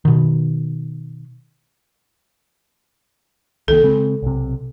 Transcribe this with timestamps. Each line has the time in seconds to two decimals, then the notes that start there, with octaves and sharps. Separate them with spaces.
0.05 B2 D#3
3.68 C2 D#3 A#3 A4
3.83 C#3 G#3 C4
4.22 B1 C3